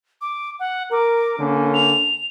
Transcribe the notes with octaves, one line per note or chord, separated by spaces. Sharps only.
D6
F#5
A#4 D6
D3 A#3 C#4
F7